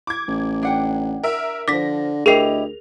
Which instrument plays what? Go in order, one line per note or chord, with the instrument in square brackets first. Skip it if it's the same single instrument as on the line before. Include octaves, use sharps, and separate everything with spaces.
[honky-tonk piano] D6 G#6
[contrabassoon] A1
[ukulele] D4 F#5 G5
[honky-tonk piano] A#4 E5
[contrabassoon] D3 [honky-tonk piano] F3 A#6 [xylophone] D6 B6
[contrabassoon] D2 [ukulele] E4 G4 D#5 [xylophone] G#4 A#4 C7 [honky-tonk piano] F7